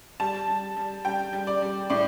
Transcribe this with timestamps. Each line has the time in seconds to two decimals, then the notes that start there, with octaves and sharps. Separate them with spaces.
0.20 G3 A5
0.48 G3
0.77 G3
1.05 G3 G5
1.33 G3
1.47 D5
1.62 G3
1.90 A2 D5